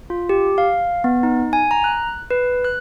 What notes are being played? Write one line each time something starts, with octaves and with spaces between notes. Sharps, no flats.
F4
G4
F5
B3
D#4
G#5
A#5
F#6
B4
F#6